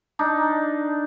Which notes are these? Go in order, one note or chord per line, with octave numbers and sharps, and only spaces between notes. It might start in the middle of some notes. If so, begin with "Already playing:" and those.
D4 D#4